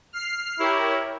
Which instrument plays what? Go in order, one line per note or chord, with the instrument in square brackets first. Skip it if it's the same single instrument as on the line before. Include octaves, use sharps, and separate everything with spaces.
[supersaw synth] F6 C7
[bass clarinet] E4 [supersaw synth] G4 A#4 C#5